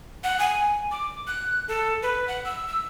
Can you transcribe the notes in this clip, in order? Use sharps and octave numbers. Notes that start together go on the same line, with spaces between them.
F#5
G#5
D6
F#6
A4
B4
F#5
E6
E6